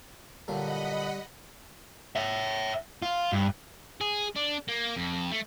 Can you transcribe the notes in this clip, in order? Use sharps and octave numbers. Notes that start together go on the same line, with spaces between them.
A#2 D3 F#3 G3 D#5 F#5 B5
C#5 E5
F4
G2
G#4
D4
A#3
F2
A3